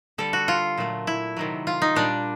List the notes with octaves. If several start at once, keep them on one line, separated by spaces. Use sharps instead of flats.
D3 G3 A4
F#4
F4
A#2 F#3 A3
E4
C3 D#3 F#3
F4
D#4
A#2 G3 D4